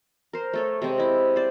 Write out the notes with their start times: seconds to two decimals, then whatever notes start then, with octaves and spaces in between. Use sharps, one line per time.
0.33 A#4 C5
0.53 A3 A4 C#5
0.82 C3 G#3 C4
0.98 E4 D#5
1.36 C5 D5